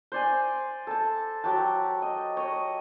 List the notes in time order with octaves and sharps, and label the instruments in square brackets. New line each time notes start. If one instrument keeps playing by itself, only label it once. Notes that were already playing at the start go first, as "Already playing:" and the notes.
[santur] C5 D5 G#5
A4 A5
F#3 G4 G5 A5
D#5
C#5 D#5